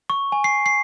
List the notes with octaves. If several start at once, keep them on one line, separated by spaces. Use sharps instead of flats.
C#6
G#5
C7
C7